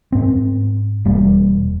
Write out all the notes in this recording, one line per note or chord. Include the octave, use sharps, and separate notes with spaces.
G#2 C4
E1 G3 A#3